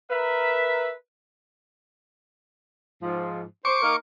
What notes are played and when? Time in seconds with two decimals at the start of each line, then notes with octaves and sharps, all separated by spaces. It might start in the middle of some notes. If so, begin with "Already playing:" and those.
0.10 A#4 B4 E5
3.02 G#2 F3
3.65 C5 C#6 D6
3.82 A#3 D#4 A#4